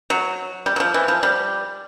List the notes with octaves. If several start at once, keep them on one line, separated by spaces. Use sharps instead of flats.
F#3
G3
F#3
F3
E3
F3
G3